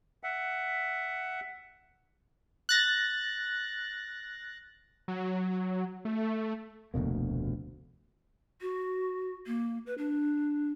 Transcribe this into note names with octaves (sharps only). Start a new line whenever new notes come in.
E5 F#5
F#6 A6 A#6
F#3
A3
F1 D2 B2 A#3
F#4
A#3
B4
D4